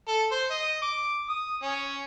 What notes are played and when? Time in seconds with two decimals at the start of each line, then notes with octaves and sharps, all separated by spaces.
0.08 A4
0.31 C5
0.50 D#5
0.82 D6
1.29 D#6
1.62 C#4